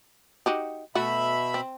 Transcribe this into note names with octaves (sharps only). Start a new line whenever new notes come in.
D#4 F#4 G4
B2 A3 F#4 E5 B5
C4